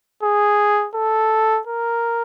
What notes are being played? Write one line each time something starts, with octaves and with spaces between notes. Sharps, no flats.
G#4
A4
A#4